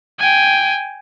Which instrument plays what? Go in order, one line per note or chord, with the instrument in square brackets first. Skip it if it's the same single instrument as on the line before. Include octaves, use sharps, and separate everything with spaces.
[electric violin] G5 G#5